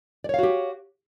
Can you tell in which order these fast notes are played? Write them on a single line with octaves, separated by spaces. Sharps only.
D5 C#5 F5 F#4 G4